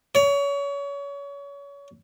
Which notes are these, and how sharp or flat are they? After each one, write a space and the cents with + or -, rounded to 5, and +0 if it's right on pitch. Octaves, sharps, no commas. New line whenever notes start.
C#5 +30